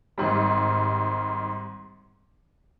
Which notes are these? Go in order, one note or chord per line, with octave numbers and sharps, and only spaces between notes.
G#1 G#2 G3